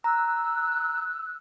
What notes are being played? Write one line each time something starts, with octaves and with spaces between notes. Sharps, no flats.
A#5 E6 F#6